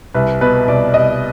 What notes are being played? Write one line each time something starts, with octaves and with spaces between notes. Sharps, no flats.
C2 B4
B2 B4
C2 D5
C2 D#5